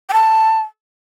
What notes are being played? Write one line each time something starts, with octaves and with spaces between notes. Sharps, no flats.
G5
A5